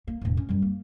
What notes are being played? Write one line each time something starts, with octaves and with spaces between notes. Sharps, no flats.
A#3
E1 A2
C#4
F#2 G3
A#3